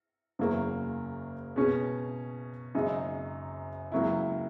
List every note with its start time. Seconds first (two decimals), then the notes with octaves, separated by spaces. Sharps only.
0.39 F#1 E2 C#3 F#3 A#3
1.56 B2 G#3 C#4 G#4
2.75 F#1 F#2 C#3 G#3 D#4
3.92 C#2 C#3 F#3 A#3 E4